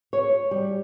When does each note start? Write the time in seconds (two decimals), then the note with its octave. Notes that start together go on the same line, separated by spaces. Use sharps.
0.13 C#5
0.51 G3